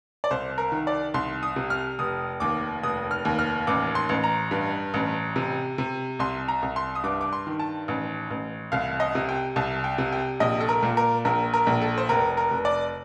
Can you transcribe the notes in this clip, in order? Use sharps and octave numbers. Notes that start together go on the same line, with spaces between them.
D5
C2 C5
A#4
D#3
D5
C2 C6
D#6
C3
F6
F1 D#6
D#2 D6
F1 D#6
F6
D#2
F6
A1 D6
C6
A1
A#5
G2
A1
C3
C3
C2 C6
A#5
C2
C6
D#6
G2 D6
D6
C6
D#3
A5
A1
A1
C2 F5
D#5
C3
G5
C2 A5
G5
C3
G5
A#1 D#5
A4
A#4
A#2
A#4
A#1 A#4
A#4
A#1
A4
C5
F1 A#4
A#4
F1
D5